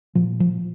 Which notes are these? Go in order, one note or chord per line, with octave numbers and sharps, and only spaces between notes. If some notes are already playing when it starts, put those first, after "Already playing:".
A#2 F3
F3